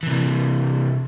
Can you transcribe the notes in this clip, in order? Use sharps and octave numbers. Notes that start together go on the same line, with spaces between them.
C3 E3